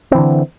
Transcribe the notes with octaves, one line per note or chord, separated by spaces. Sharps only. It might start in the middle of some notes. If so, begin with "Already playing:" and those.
D3 E3 C4